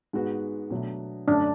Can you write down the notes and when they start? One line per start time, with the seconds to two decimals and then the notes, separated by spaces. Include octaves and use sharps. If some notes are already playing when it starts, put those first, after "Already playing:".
0.13 G#2 G#3 B3 F#4
0.70 B2 F#3 A3 D4
1.28 F#2 D3 F#3 A3 C#4 D4